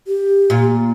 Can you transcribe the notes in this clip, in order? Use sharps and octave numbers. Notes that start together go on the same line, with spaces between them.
G4
A#2 F4